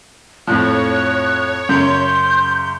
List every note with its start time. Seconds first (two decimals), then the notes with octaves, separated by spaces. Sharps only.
0.47 F2 A2 F3 C#5 F#6
1.69 F#2 C#3 C6 G6